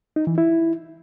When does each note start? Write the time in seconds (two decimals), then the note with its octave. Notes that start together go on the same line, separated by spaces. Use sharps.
0.16 D#4
0.27 E3
0.38 E4